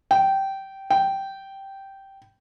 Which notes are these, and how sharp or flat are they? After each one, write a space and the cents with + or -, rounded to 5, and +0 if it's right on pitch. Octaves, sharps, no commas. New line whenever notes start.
G5 -15
G5 -10